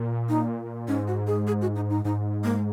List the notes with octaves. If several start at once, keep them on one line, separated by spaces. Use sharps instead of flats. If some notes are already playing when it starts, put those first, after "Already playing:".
Already playing: A#2
D#4
G#2 C#4
F#4
G#4
G#4
F#4
D#4
D#4
G#2 D#4
A#3